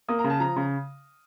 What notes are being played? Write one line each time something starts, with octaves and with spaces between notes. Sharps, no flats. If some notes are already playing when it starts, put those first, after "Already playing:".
A#3 D#6
A#5
C#3
A5
F3 A#5
C#3